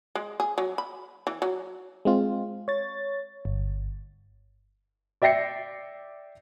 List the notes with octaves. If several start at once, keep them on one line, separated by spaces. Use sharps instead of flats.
G#3
G#4
F#3
B5
E3
F#3
G#3 C4 F4
C#5 A6
G1
D5 E5 G5 A#6 C7 C#7